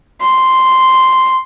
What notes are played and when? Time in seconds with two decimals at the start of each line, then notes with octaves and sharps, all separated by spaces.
0.22 C6